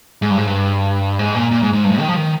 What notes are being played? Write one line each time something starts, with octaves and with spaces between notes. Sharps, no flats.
G#2
G2
G#2
G2
G#2
A#2
A#2
G#2
G#2
G2
G#2
D#3
F3
D#3